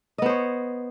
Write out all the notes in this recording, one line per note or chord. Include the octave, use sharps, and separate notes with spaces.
B3 C5 C#5 D#5